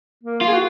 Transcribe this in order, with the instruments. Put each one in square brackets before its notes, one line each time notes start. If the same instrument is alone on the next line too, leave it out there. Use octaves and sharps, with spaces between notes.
[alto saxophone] A#3
[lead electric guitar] F4
[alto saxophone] G#4
F#4